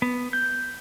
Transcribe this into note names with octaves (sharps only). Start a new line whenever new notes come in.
B3
G6